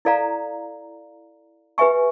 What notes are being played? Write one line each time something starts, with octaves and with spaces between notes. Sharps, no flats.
E4 A4 D5 F5 A#5
G4 B4 E5 G#5 C#6